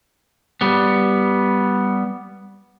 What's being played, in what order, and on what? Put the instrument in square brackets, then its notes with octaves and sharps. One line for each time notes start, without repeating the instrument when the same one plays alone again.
[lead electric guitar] G3 B3